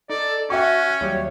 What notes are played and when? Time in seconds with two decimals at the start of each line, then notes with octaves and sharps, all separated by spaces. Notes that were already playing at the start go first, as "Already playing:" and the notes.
0.10 D#4 A4 D5
0.50 C#4 F#4 E5 G5 C#6
1.01 D#2 F#3 G3 C#5